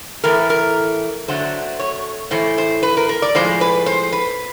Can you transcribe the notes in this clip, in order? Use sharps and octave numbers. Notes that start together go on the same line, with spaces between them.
A2 E3 A3 A#4
A#4
D3 F#3 A3 C5
C#5
A2 E3 A3 C5
C5
B4
A#4
A#4
D5
A2 F3 G#3 C5
B4
C5
B4